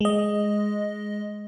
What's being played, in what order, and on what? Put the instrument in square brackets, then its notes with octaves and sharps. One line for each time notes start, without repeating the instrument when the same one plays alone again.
[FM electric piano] G#3 D#5